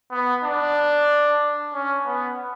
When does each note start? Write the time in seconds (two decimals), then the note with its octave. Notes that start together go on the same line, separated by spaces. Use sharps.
0.11 B3
0.43 D4
1.73 C#4
2.06 B3